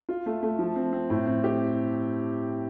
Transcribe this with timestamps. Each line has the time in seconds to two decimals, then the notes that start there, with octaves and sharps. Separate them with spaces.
0.09 F4
0.26 A3
0.43 A3
0.59 F3
0.76 C4
0.93 C4
1.10 A2
1.26 C4
1.44 G4